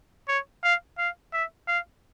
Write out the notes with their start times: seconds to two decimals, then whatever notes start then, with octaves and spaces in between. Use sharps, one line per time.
0.28 C#5
0.64 F5
0.98 F5
1.33 E5
1.68 F5